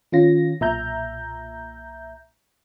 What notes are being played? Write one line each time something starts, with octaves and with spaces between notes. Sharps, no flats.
D#3 C#4 F4 A#6
B1 A#2 E5 A#5 G6